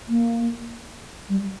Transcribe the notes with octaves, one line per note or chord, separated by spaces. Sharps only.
A#3
G3